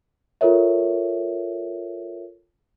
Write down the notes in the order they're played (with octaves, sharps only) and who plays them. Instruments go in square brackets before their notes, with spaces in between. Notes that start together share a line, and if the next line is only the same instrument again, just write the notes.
[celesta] F4 A4 A#4 C#5 E5